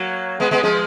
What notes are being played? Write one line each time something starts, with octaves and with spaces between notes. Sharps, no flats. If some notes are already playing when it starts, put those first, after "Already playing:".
Already playing: F#3 A#3
G#3 B3
G#3 B3
F3 G#3